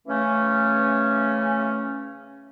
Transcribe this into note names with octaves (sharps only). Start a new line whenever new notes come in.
C#3 E3 A3 C#4